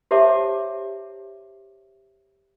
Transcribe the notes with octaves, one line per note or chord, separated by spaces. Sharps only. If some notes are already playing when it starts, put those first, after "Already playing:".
G4 C5 C#5 E5 A5 D6